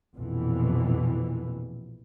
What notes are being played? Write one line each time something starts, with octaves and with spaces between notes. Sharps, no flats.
A#1 F2 B2 E3